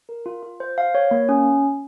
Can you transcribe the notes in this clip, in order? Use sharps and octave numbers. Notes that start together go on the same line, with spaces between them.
A#4
F4
F4
C5
F5
C#5
A#3
C#4